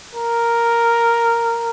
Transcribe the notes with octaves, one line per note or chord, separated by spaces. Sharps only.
A#4